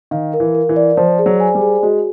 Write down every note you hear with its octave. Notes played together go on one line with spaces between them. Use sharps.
D#3 F5
A#4
E3
A#4
E3
D5
F3 C5
G#4
F#3
G#5
G3
G#4
G#3 F#4